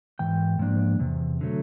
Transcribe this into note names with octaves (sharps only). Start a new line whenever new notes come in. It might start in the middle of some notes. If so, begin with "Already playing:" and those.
G#2 E3 G5
G#2 F3 A#3 D4
E2 C3
D3 F#3 A3